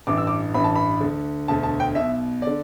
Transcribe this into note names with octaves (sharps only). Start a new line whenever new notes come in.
A1 G2 E3 D6
E6
D6
A1 G2 E3 B5
A5
B5
D2 D3
E1 D2 D3 A5
A5
G5
B1 B2 E5
D3 D5